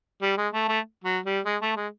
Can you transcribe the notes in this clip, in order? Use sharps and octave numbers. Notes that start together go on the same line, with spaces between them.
G3
G#3
A3
A3
F#3
G3
G#3
A3
G#3